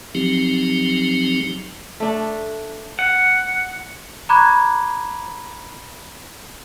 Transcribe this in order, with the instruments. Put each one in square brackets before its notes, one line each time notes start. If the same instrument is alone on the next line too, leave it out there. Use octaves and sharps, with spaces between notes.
[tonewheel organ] F3 F#3 C4 D#4 G4
[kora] A3 D4
[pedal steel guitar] F#5
[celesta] A#5 B5 C#6 D6 F#6 G#6